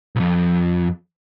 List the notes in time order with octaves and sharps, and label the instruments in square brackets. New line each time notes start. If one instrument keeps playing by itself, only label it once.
[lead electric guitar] B1 F2